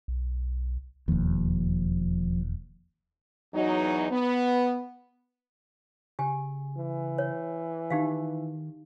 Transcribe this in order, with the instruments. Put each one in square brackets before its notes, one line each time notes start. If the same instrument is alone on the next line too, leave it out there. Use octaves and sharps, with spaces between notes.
[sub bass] B1
[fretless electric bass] E1 D#2 [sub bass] F3
[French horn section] E2 F#3 D#4
B3
[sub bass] C#3 [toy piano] G4 G#5
[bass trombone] E3
[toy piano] C#5
[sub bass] D#3 [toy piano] D#4 G4 F5